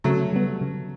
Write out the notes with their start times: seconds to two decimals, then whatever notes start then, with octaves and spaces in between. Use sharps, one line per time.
0.04 C#3 F#3 A3
0.33 G3 B3
0.61 C#3